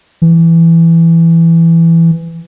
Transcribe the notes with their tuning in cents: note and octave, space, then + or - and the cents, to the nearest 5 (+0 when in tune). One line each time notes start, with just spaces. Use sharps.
E3 +10